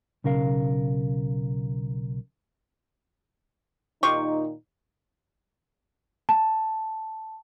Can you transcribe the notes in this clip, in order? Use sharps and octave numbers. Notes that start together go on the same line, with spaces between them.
B1 C#3 A#4 F5
A#2 D#3 D#4 F4 G4 C#6
A5